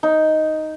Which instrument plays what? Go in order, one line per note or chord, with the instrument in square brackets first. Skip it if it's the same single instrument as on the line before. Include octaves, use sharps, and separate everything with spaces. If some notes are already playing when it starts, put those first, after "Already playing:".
[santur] D#4